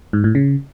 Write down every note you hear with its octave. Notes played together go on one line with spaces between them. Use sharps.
G#2
A2
C#3